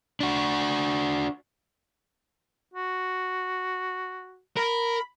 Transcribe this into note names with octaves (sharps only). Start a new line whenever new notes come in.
D4 F#4
F#4
A#4 B5